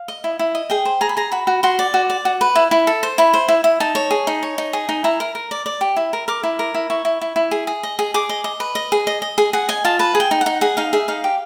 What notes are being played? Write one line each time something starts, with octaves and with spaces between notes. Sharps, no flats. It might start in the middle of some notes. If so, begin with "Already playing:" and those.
Already playing: F5
D#5
E4
E4
D#5
G#4 G5
C5
G#4 A#5
B5
G#4 A#5
F#4 B5
F#4
F#4 C6
D5
F#4
D5
F#4
B4
E4
E4
A4
C5
E4 B5
C5
E4
E4
D#4 A5
C#5
G#4
D#4
C#5
D#4
G#4
D#4
E4 A#5
A#4
A#4
D5
D5
G4
E4
A#4
A#4 D6
E4
A#4
E4
E4 C#6
E4
E4
E4
G#4
G#4
D#5
G#4
G#4 D6
D#5
D#5
B4
D#5
G#4
D#5
D#5
G#4
G#4 F#5
D#5 G#5
F4 A5
B4 A5
G#4
G5
D#4
F#5
D#4
G#4 F#5
D#4 F5
G#4 E5
D#4 F5
G4